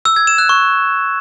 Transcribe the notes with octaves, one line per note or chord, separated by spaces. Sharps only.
E6
G#6
E7
F#6
C#6